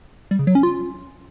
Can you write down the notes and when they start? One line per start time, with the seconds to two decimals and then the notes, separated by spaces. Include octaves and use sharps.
0.31 G3
0.39 C#3
0.47 F#3
0.55 C#4
0.63 F4